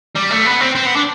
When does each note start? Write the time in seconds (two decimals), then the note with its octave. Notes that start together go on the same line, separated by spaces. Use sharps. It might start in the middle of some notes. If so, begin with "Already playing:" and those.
0.15 G3
0.30 A3
0.46 B3
0.61 C4
0.75 C4
0.86 B3
0.96 D4